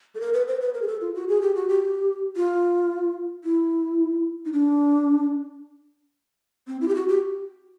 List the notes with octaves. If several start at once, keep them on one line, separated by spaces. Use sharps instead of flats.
A4
A#4
B4
C5
B4
A#4
G#4
A4
F4
F#4
G#4
G4
F#4
G4
F4
E4
D#4
D4
C4
E4
G4
F#4
G4